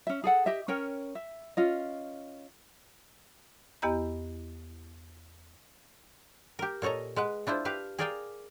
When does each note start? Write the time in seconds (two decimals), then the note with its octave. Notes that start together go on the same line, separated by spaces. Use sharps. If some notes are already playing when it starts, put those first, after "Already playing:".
0.07 C#4 E5
0.24 G#4 A4 F#5
0.46 G4 D#5 E5
0.68 C#4 A#4 C#5 G5
1.15 E5
1.57 C#4 F4 D#5
3.82 E2 B3 E4 G4 D#5 A#5
6.59 G4 A#4
6.82 A#2 A4 C#5 D#5 A#5
7.16 G#3 B4 F#5
7.47 D4 E4 F4 C5
7.65 G4 B4 F5
7.99 G#4 A#4 D5 F5 G5 G#5